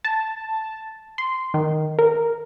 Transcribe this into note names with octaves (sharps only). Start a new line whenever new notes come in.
A5
C6
D#3
A#4